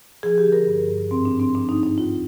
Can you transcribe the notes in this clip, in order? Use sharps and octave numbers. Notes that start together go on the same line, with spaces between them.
F3 G#4
G4
D3
A#4
G2
G2
G#2 C4
D4
F3
C4
F3 D4
D#4
G#2
D#4
D#2 F4